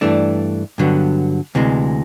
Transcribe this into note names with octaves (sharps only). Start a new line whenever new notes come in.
G2 E3 A3 D4
G2 D3 F#3 B3
D2 C3 E3 G#3